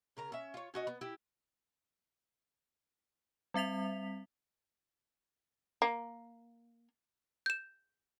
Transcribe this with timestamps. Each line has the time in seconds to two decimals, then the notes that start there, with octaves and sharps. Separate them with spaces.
0.17 C#3 A#4 A#5
0.32 C#4 E5
0.54 F4 C#5
0.74 C#4 F#4 D#5
0.87 B3
1.01 E4 G4
3.54 G3 C4 E5 B6 F7
5.82 A#3
7.46 G6 E7